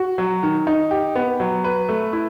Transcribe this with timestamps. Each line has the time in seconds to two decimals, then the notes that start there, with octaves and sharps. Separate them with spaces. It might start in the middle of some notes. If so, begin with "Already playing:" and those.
Already playing: F#4
0.18 F#3
0.43 D#3
0.67 D#4
0.91 G4
1.15 B3
1.40 F#3
1.64 B4
1.89 A3
2.13 E4